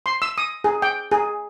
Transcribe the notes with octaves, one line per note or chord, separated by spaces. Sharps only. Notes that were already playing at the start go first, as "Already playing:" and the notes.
C6
E6
D#6
G#4
G5
G#4